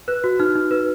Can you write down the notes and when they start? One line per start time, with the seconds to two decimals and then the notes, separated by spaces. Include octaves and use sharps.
0.08 B4 F#6
0.24 F#4
0.40 D#4 F6
0.55 D#4
0.71 B4